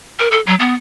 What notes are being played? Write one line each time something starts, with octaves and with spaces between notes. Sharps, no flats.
A#4
A4
F#3
B3